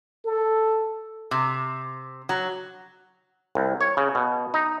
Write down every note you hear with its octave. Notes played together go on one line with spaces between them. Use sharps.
A4
C3
F#3
C2
C#5
C#3
B2
D#4